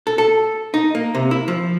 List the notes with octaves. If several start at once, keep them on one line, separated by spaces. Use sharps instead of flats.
A4
A4
D#4
A#3
C3
E4
F3